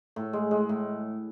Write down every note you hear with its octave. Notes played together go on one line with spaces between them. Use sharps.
A2
G#3
G#3
A2